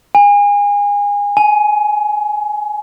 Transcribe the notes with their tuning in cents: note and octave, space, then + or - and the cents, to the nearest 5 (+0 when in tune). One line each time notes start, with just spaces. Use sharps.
G#5 -30
G#5 +25